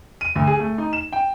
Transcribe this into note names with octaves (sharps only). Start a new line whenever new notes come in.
D#7
D2
G#4
A3
D#4
E7
G5